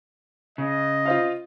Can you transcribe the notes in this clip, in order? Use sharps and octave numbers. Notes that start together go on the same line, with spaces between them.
C#3 D#5
F4 C5 F5